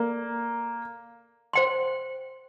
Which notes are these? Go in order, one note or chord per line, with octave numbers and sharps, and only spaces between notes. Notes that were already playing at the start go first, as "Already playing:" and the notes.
Already playing: A#3 A4 D5
C5 G5 C6